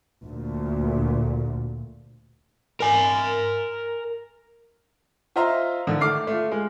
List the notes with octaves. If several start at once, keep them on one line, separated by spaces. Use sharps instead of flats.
D2 A#2
A#4 G#5
F4 C5 D#5 E5 A#5 C6
D3 D#3
A3 D6 F6 C7
A3 F4
G#3